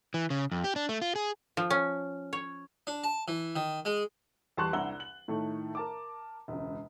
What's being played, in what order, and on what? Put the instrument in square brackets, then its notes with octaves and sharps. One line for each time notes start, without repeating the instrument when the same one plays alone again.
[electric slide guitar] E3
C#3
F2
G4
D4
A3
F4
G#4
[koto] F3
C#4
C#5
[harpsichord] D4
A5
E3
D#3
G#3
[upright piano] E2 G3 A5 C6 C#6 F#6
C2 D4 F#5 A#5 E6 G7
F#7
A2 D#3 A3
A#4 A5 D6
E1 C#2